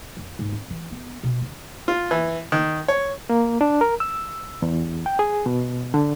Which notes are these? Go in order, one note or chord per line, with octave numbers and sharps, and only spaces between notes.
F2
G#2
C4
E3
B3
B2
D#3
F4
E3
D#3
C#5
A#3
D4
A#4
E6
E2
G5
G#4
B2
D3